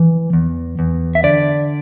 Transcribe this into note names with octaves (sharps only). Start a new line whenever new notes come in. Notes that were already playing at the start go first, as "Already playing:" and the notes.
Already playing: E3
E2
E2
E5
D3 D5